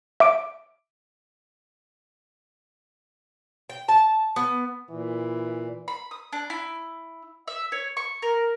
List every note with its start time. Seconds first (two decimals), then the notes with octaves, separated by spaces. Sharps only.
0.20 E5 D6 D7
3.70 G5
3.89 A5
4.36 B3
4.90 A#2 E3
5.88 B5
6.11 D#6
6.32 D4
6.50 E4
7.48 E5
7.72 C#5
7.97 C#6
8.22 A#4